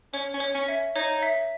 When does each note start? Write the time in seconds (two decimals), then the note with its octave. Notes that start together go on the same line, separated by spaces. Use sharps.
0.13 C#4 C#5
0.34 C#4
0.40 C#5
0.55 C#4
0.68 E5
0.95 D#4 C#5
1.23 E5